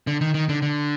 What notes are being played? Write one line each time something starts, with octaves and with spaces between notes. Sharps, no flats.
D3
D#3
D#3
D3
D3